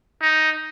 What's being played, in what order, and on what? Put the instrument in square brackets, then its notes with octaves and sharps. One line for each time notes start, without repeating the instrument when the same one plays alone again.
[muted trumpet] D#4